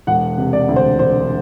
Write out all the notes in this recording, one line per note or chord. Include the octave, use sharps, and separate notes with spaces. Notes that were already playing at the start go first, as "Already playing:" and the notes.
E1 F#5
C3
D5
D2
C5
E1 C5